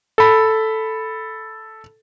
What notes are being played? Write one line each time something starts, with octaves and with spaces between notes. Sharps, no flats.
A4 B5